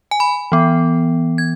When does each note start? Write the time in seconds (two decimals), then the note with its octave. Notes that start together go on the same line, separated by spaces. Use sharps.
0.11 G#5
0.20 B5
0.52 E3 B3
1.38 G#6